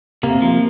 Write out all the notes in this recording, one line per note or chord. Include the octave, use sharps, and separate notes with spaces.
C3 A#3
F3